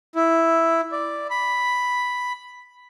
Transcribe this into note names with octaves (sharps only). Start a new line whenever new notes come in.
E4
D5
B5